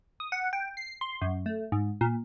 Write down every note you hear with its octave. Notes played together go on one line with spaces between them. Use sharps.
D#6
F#5
G5
C7
C6
F#2
A3
G#2
A#2